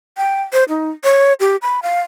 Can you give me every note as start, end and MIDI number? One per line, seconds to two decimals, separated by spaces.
0.17 0.42 79
0.53 0.64 72
0.69 0.90 63
1.04 1.33 73
1.40 1.56 67
1.62 1.80 83
1.83 2.00 77